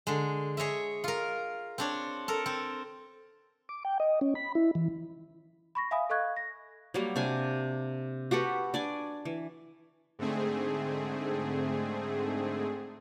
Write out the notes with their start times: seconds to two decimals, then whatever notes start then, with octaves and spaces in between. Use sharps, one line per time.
0.07 D3 G#3
0.57 G#4 C#5 D#5 E5
1.04 F4 A#4
1.78 C4 D4 C#5
2.28 A4 A#4
2.46 C4
3.69 D6
3.85 G5
4.00 D#5
4.21 C#4
4.35 B5
4.55 E4
4.75 E3
5.75 B5 C#6 A#6
5.91 E5 F5 G#5 B5 D#6
6.10 A4 D#5 F5 C#6 F#6 G#6
6.36 A#6
6.94 F#3 G3 A#3
7.16 C3 D4 G#5
8.31 F#4 G4 A4 B4
8.74 D4 D5 G#5
9.25 E3
10.19 G#2 D3 A3 C4 G#4